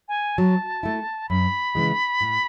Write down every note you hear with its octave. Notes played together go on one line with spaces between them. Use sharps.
G#5
F#3 A5
A3 E4
F#2 B5
C#3 E3 G#3
A2